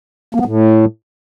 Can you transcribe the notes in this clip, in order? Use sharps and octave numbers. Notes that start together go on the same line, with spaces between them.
A#3
B3
A2